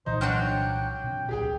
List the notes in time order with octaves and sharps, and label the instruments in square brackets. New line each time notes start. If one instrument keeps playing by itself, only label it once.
[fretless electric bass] C2 A#2 E3 [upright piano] D#4 [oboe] C5
[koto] F#3 D4 F#4 [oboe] G5 [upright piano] F6
[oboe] G5
[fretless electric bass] B2 C4
[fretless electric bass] D1 B1 [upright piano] G4 G#4 G5